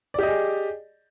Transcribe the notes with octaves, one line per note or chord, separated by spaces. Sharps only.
G4 G#4 D5 D#5